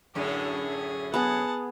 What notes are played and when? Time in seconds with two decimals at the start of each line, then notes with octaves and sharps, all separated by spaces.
0.15 F#2 A2 D3 G#4
1.14 B3 G#4 F#5 A5